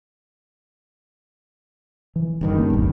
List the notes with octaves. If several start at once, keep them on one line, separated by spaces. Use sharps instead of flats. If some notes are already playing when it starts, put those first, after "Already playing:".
E3
F#1 G2 D#3
A#3 C#4
D1 A#1 F2 G#2